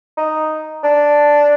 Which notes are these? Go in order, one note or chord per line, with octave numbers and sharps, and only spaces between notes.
D#4
D4